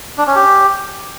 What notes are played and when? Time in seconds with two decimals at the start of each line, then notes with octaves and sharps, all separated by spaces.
0.18 D4
0.27 C#4
0.35 G4